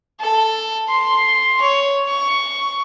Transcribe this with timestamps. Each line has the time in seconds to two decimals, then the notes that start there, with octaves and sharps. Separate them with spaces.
0.20 A4
0.89 C6
1.61 C#5
2.08 C#6